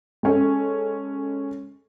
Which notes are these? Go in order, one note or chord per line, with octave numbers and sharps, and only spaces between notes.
G#3 C#4 A4